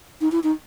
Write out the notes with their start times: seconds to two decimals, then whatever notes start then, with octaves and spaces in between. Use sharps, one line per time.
0.21 D#4
0.32 E4
0.43 D#4